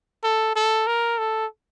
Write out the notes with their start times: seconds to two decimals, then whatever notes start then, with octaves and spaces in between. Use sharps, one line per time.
0.24 A4
0.56 A4
0.87 A#4
1.18 A4